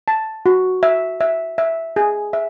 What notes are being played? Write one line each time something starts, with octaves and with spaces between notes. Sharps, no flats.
A5
F#4
E5
E5
E5
G#4
E5